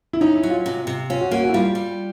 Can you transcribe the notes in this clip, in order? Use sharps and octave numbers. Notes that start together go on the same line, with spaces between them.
E4
C#4 D#4
E4
F#3
F4
C3
C3
C#4 F4
F#4
A#3 F#4
F#4
E4
G3 F4
G3